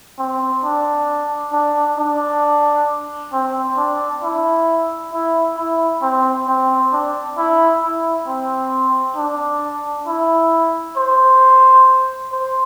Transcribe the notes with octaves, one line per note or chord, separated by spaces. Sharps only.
C4
D4
D4
D4
C4
D4
E4
E4
E4
C4
C4
D4
E4
E4
C4
D4
E4
C5
C5